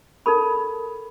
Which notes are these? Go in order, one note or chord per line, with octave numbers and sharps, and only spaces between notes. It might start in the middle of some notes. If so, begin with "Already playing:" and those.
D#4 A4 A#4 B5